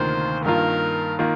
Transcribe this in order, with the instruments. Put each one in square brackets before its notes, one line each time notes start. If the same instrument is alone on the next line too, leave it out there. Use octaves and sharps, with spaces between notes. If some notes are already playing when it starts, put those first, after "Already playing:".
Already playing: [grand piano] D2 C3 D#3 A#3 F4 [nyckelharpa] C5
[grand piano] G2 D#3 A#3 F4 [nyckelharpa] A#4
[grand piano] D#3 A#3 F4